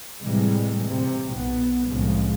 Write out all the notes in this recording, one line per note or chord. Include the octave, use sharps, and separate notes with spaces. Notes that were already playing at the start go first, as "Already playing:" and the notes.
A2 C3 E3 G3 G#3
C3
B1 B3
C2 A2 C#3 F3 G#3